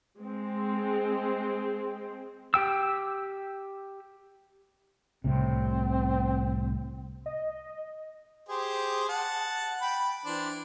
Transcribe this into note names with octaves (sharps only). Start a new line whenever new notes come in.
G#3 C4
G4 G5 E6
C2 A2 C3 C4
D#5
G4 G#4 C5
F#5 A5
G5 B5
E3 D4 C5